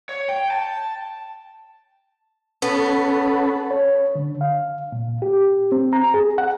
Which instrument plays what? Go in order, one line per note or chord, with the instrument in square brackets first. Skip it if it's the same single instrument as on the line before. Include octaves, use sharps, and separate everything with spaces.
[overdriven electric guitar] C#5
G5
A5
[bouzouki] B3 [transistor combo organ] C#4 A4 B4
[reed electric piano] C#5
D3
F5
A#2
G4
C4
A#5
G#4
F#5